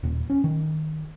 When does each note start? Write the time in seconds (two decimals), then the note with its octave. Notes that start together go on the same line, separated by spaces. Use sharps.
0.03 D#1
0.30 C#4
0.44 D#3